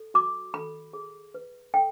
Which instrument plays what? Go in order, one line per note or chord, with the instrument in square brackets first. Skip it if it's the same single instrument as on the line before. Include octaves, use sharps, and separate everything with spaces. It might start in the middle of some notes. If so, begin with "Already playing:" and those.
Already playing: [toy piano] A4
F#4 D6
A4 B5
G#4
B4
A4 G5